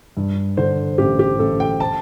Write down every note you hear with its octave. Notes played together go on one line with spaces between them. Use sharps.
G2
D3 C5
A1 G4
G4
A1 A4
G5
A5